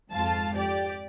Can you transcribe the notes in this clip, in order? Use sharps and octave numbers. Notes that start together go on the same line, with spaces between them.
F2 G#2 F4 A5
G4 D5